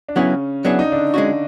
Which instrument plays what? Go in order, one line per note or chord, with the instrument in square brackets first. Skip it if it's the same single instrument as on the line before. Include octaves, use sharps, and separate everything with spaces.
[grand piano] D4
[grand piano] C#3 C#4 [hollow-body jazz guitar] F#3 B3 E4 G#4
[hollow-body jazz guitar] F#3 B3 E4 G#4 [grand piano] D4
[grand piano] D#4
D3 D4
[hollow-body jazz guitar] G#3 C#4 F#4